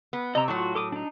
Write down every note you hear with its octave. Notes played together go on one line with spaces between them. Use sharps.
B3
C3 D#5 A#5
A2 F#3 F4 F#4 C#6
A4 D6 D#6
D4 D#4